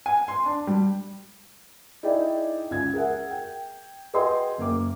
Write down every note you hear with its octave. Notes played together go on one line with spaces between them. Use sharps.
G#5
C6
D4
G3
D#4 E4 G#4 D5 G5
C#2 G#6
G#4 A#4 E5 F#5
G5
F#4 G#4 B4 D#5 G5 C6
F#1 A#3 D6